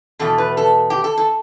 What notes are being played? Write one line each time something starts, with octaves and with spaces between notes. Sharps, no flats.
E2 B2 A3 A4
B4
A4
G4
A4
A4